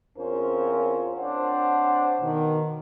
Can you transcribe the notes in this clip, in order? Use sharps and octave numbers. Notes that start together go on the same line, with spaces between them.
E2 C4 C#4 F4 A#4 C5
C4 D4 C5 C#5 F#5
B2 D#3